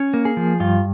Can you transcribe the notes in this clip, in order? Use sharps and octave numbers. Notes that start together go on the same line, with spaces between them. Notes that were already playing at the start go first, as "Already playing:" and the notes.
Already playing: C#4
A#3
G#4
F3
G2 F4